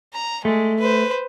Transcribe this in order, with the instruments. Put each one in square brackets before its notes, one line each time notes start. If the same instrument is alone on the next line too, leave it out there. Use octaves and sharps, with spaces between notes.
[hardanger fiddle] A#5
[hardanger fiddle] G#3 [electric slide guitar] A3
[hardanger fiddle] B4 C5